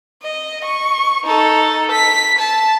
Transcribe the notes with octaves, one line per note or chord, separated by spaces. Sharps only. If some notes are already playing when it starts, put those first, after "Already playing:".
D#5
C#6
D#4 A4
B6
A5